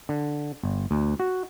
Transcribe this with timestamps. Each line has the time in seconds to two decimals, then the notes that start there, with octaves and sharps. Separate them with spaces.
0.09 D3
0.63 G1
0.91 D2
1.20 F#4